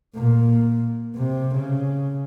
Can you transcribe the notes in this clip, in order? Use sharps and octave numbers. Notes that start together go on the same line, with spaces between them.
A#2
C3
C#3